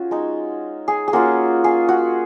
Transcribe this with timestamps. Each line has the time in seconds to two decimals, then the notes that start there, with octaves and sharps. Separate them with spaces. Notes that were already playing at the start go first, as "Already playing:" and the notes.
Already playing: C#4 F4 F#4 G#4
0.11 G#3 D#4
0.88 G#4
1.08 G#4
1.13 A#3 C#4 F4 F#4
1.64 G#4
1.89 F#4